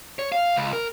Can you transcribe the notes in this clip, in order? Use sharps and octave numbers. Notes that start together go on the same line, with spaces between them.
C#5
F5
C#2
A#4